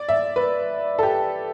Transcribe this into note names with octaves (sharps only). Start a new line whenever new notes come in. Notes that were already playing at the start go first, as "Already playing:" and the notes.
Already playing: D5
E5
B4
A4
G4